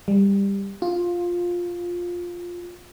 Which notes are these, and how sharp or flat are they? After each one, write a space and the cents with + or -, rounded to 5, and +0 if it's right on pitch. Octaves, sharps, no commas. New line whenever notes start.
G3 +20
F4 +10